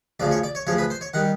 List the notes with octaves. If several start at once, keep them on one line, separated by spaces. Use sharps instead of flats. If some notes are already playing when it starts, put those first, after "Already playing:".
D2 C#3 F3 D5
C#5
D5
C#5
D2 C#3 F3 C#5
B4
C5
C#5
D#3 G3 F#5